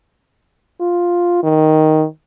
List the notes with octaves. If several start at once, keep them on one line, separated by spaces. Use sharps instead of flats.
F4
D#3